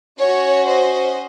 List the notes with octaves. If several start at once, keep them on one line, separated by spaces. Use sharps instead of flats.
C#4 F#4 C#5
C5 D#5